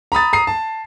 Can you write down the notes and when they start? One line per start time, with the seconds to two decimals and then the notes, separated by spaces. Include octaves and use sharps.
0.12 A#5 B5 D#6 A6
0.33 A#5 D#6 C7
0.47 A5